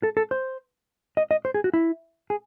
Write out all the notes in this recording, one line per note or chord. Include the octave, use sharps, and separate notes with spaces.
A4
A4
C5
D#5
D#5
C5
G#4
F#4
E4
G#4